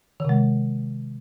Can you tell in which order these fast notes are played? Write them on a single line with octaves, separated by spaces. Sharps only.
D#3 C3 G#3